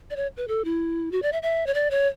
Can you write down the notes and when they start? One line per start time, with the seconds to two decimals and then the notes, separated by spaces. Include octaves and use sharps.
0.10 D5
0.16 C#5
0.37 B4
0.48 A4
0.65 E4
1.12 F#4
1.22 D5
1.32 E5
1.43 E5
1.67 C#5
1.74 D5
1.91 C#5